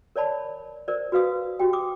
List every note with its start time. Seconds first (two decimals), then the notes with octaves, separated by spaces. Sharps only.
0.16 A#4 C#5 D5 A5 B5
0.88 A#4 C5 D5
1.12 F#4 B4 F5 D#6
1.59 F#4 G4 G5
1.73 D6 D#6